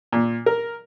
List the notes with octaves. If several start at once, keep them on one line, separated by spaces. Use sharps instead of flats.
A#2
A#4